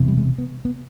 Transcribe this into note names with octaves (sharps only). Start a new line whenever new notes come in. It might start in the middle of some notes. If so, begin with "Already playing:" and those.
Already playing: E1 E2 C3
G3
G#3
B3
B3